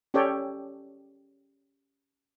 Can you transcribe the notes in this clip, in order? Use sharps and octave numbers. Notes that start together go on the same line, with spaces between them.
C#4 G4 A4 C#5 D5 G5